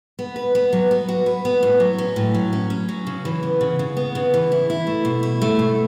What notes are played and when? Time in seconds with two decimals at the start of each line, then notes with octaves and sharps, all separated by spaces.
0.19 B3
0.36 B4
0.55 B3
0.73 F#3
0.91 B3
1.09 F#4
1.26 B4
1.45 B3
1.63 A2
1.80 F#3
1.98 C#4
2.16 A2
2.34 F#3
2.53 C#4
2.70 C#4
2.89 F#3
3.07 C#3
3.25 E3
3.43 B3
3.61 C#3
3.79 C#3
3.97 B3
4.15 C#3
4.34 E3
4.52 E4
4.70 E4
4.87 A3
5.05 B2
5.23 E4
5.42 A3
5.59 B2